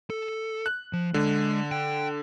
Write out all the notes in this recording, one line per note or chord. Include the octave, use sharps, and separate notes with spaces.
A4
F#6
F3
D3 G#3
G5